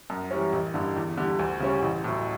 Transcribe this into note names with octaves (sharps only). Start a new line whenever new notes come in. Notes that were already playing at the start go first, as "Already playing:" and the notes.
F#2
E3 G3 C#4
A1
G2 D3
E2
D3 G3
D2
C#3 G3 C#4
A1
A2 F#3